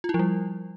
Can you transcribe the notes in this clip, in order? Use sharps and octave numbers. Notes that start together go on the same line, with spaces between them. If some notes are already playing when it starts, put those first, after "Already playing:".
F4
E4
F3
G3